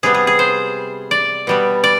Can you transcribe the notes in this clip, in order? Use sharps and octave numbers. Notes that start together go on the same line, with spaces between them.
C3 G3 B3 G#4
G#4
G#4
C5
D5
B2 G3 B3
D5